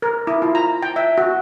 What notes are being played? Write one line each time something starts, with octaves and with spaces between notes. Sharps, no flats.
A#4
E4
F4
A#5
G5
E5
F#4